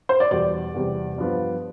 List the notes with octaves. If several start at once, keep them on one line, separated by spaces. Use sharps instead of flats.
C5
D5
E2 B2 G3 D5
E2 C3 G3
G2 F3 B3